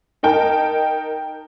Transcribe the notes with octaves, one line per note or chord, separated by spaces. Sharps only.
D#4 A#4 G5 A5